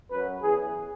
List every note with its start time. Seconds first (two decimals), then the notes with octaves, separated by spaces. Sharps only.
0.11 F#2 F#3 B4
0.42 E2 E3 G#4